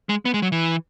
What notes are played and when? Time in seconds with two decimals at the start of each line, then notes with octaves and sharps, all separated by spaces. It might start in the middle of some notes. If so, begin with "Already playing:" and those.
0.09 G#3
0.25 B3
0.34 G#3
0.42 F#3
0.52 E3